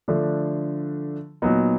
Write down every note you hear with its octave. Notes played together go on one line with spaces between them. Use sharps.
D3 F3 A3 D4
A#2 F#3 B3 D#4